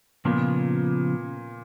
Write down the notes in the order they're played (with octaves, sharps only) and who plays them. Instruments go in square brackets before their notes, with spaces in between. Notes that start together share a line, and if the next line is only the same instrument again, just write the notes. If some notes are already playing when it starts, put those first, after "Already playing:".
[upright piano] A#2 A#3 [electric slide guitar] C#3 F3 B3